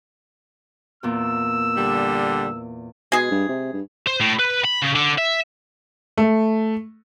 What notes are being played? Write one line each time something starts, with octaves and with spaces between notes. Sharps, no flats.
E2 A#2 E6
D3 G3
B2 G#3 G#4
G2
C3
G2
C5
A2
B4
B5
C#3
D3
E5
A3